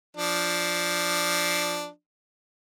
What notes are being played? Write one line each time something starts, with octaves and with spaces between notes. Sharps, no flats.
F3 D4